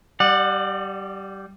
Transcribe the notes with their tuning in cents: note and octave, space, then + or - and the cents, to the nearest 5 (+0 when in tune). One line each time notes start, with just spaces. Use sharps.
G3 -15 D5 +30 F#5 -15